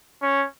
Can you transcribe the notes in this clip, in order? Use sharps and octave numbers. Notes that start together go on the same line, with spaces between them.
C#4